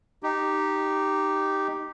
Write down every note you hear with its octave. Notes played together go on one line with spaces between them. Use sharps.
D#4 G4